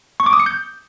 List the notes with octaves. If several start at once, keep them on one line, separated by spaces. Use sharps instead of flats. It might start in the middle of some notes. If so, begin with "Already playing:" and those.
C#6
D6
D#6
C#7
G6